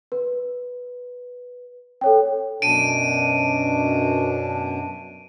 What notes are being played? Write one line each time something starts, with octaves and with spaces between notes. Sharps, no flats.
B4
A4 C#5 G5
F#2 B2 D4 D7 D#7